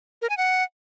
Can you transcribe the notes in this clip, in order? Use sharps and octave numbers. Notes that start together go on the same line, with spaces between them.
A#4
G#5
F#5